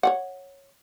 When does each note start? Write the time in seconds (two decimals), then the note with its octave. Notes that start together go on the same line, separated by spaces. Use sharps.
0.03 C#5 D5 F#5